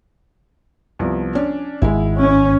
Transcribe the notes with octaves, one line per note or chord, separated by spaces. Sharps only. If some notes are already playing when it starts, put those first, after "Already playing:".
C2 F3 B3
C#4 D4
G#1 G#3 E4
C#4